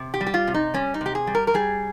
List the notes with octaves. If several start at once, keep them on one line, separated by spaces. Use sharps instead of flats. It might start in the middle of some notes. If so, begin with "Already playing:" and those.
Already playing: C3
G4
G3
G4
F4
C3
D#4
G3 C#4
D#4
C3 G4
G#4
G3
A#4
A#4
G3 G#4